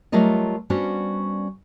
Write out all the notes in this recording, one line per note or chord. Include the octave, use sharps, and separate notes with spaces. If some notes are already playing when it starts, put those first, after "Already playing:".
F#3 G3 A3 F4 A#4 D#5
G3 B3 C#4 D4 F#4 C5